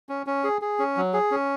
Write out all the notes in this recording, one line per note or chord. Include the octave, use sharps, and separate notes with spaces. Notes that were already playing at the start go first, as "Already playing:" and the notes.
C#4
C#4
G#4
G#4
C#4
F#3
G#4
C#4